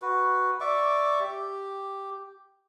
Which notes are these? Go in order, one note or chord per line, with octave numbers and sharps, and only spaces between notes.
F#4 B4
D5 E5 C#6 D6
G4